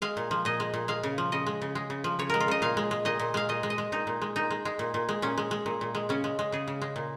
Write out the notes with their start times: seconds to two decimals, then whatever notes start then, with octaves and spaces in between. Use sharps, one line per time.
0.02 G#3 F5
0.17 A#2
0.31 F3
0.45 A#2 D#5
0.60 G#3
0.74 A#2
0.88 G#3 F5
1.03 C#3
1.18 F3
1.32 C#3 D#5
1.46 G#3
1.62 C#3
1.75 G#3
1.90 C#3
2.04 F3
2.19 C#3 C#5
2.30 G#3 A#4
2.40 F4
2.48 C#3 D#5
2.62 A#2 F5
2.77 G#3
2.91 G#3
3.05 A#2 D#5
3.19 A#2
3.34 G#3 F5
3.49 A#2 D#5
3.63 G#3
3.70 D#5
3.78 G#3
3.92 A#2 D#4
4.07 A#2
4.22 G#3
4.36 A#2 D#4
4.51 G#3
4.65 G#3
4.79 A#2
4.94 A#2
5.09 G#3
5.22 A#2 C#4
5.38 G#3
5.51 G#3
5.66 A#2
5.81 A#2
5.95 G#3
6.09 C#3 C#4
6.24 G#3
6.39 G#3
6.52 C#3 G#4
6.68 C#3
6.82 G#3
6.96 A#2